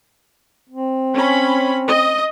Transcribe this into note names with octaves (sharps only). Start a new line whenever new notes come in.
C4
C#4 B5
D#5